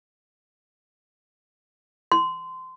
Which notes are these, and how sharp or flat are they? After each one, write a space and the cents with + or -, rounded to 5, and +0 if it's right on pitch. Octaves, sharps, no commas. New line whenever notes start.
C6 -25